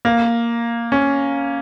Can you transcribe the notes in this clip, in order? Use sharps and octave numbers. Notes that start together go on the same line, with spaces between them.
A#3
C#4